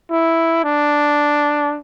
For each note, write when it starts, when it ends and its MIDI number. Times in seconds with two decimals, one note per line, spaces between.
0.10 0.61 64
0.64 1.77 62